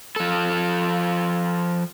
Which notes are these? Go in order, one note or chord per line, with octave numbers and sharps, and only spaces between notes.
F3 A4